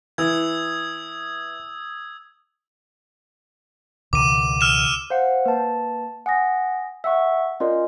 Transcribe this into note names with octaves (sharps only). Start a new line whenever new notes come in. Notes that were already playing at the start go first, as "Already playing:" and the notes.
E3 D#6 E6 G#6
C#2 B2 D#3 D6 D#7
E6 F6 E7
C5 F5 F#5
A#3 B4 A5
F#5 G#5 D#6 A#6
E5 F#5 C#6 E6
C#4 F4 A#4 D5 D#5